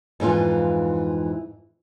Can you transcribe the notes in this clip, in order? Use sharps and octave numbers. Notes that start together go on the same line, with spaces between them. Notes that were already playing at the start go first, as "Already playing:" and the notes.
F2 G#2 E3 F4